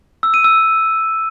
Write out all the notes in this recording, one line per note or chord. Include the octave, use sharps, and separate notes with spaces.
E6
D#7
E6